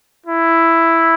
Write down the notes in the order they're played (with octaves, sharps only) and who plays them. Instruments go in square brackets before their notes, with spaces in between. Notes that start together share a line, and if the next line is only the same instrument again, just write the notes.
[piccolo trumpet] E4